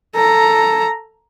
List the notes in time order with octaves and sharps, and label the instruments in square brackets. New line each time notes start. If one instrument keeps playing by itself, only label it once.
[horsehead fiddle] A4 A#5